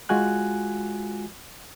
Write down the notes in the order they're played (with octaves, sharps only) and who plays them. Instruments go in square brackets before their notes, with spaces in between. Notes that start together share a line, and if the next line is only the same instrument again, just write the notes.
[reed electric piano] G#3 F4 F#4 G#5 F#6